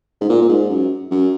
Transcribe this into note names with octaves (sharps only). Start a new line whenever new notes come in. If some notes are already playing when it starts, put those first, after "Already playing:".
G#2
A#2
A#2
G#2
F#2
F#2